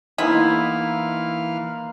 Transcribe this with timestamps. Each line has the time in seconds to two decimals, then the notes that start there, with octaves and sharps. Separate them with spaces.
0.18 E3 A#3 B3 D#4 E4 C5 F5 F6